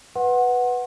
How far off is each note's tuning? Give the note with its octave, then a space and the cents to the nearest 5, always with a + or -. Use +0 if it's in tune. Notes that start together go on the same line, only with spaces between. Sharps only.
B4 +0 F#5 +0 C6 +35